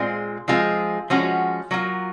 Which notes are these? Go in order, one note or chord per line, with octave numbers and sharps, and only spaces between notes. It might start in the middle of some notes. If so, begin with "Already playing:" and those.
Already playing: A#2 G#3 C4 F4 G#4
F3 G#3 C4 F4 G#4
F3 G#3 C#4 F#4
F#3 A#3 F4